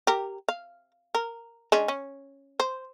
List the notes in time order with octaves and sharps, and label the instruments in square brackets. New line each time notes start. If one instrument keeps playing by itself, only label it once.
[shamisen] G4 A#4
F5
A#4
G#3 C#4 D4
C#4
C5